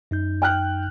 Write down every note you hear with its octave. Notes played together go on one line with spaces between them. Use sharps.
F#2 D#4 G6
G5 F6 F#6